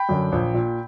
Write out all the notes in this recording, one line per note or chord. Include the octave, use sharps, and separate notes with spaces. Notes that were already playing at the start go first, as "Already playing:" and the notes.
Already playing: G5 B5
F#2 D3
A#1
A#2